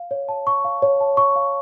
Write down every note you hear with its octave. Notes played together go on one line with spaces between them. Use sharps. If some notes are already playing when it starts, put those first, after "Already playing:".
Already playing: F5
C#5
A5
C#6
F5
C#5
A5
C#6
F5